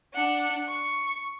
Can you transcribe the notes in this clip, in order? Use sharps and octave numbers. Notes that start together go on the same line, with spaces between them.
D4 F#5
C#6